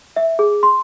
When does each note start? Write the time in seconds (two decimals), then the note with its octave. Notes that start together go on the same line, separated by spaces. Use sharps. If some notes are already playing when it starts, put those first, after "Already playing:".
0.16 E5
0.39 G#4
0.63 C6